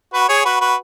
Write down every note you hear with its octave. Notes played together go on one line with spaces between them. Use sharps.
F#4 B4
G#4 C#5
F#4 B4
F#4 B4